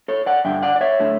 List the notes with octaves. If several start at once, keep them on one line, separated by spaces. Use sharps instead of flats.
A4 C#5
D5 F#5
G2 D3 G3 E5 G5
D5 F#5
D5
C#5 E5
D3 A3